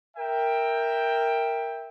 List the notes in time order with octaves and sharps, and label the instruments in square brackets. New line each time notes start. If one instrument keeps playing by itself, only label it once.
[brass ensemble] A#4 E5 G5